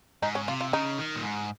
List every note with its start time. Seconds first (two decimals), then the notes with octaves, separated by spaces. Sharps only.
0.22 G#2 D#4
0.35 C#4
0.48 C3 F4
0.61 F4
0.73 C#3 D#4
0.98 D#3
1.16 A#2
1.23 G#2